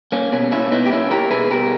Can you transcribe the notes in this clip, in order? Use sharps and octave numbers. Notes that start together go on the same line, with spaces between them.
A#3 C#4
B2 C#4
A#3 C#4 E4
B2 B3 D#4
G4
A#3 C#4 E4
A#3 G4 A#4
B2 G#4 B4
B2 G4 A#4